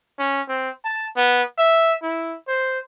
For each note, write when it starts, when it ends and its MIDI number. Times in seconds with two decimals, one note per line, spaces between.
0.19 0.41 61
0.48 0.70 60
0.84 1.06 81
1.16 1.43 59
1.58 1.94 76
2.03 2.36 64
2.48 2.79 72